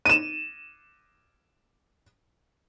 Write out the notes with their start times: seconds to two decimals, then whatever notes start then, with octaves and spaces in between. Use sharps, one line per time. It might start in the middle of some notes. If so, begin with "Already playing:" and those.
0.05 D#7 E7